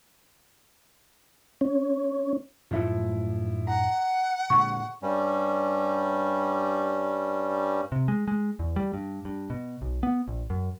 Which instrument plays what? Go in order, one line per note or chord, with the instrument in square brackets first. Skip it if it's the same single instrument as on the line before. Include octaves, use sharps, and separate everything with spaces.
[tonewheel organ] C#4
[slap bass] F#2 A2 A3 [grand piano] F3 E4
[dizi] F#5 [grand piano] A#5
[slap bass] A#2 D3 G#3 [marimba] C#6
[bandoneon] G2 G3 C#4
[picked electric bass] C3
G#3
G#3
E2
G3
G2
G2
B2
B1
B3
A#1
F#2